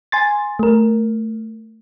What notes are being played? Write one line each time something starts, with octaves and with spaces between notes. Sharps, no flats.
G#5 C6 A6
A3 A#4